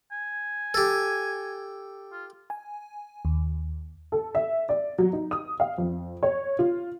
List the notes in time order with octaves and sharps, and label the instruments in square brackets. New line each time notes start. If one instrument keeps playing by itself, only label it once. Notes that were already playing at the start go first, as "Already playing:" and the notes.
[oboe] G#5
[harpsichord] G4 A4
[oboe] F4
[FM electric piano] G#5
D#2
[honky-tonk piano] A4
E5
D5
F#3
D#4
D#6
F5
F2
C#5
F4